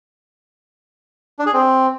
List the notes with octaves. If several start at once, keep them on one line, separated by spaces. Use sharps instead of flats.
D4
G#4
C4